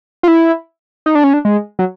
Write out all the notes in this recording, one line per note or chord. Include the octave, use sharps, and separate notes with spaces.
F4
E4
D#4
D4
C#4
D4
G#3
F#3